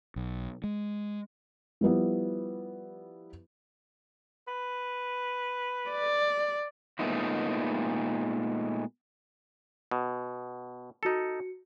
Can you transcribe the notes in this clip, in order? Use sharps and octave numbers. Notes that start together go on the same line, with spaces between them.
B1
G#3
F3 G3 B3 E4
B4
D5
A#2 G#3 A3 B3 D#4 E4
B2
D#4 F#4 A4 C#7